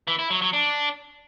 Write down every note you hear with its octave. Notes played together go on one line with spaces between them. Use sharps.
E3
E4
F#3
F#3
D4